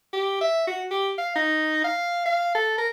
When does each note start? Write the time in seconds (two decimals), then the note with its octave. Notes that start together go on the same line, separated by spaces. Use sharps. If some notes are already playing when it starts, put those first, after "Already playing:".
0.13 G4
0.41 E5
0.67 F#4
0.91 G4
1.18 F5
1.36 D#4
1.84 F5
2.25 F5
2.55 A4
2.78 A#4